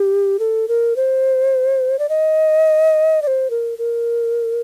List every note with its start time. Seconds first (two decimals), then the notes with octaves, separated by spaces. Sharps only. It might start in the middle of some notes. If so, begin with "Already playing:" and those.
Already playing: G4
0.39 A4
0.68 A#4
0.96 C5
1.99 D5
2.09 D#5
3.22 D5
3.27 C5
3.50 A#4
3.78 A#4